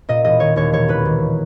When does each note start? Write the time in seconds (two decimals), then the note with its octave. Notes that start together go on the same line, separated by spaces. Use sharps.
0.09 A#2 D#5
0.24 E1 D#5
0.40 D#3 C#5
0.56 D#2 C#5
0.72 E1 C#5
0.88 E1 B4
1.05 D#3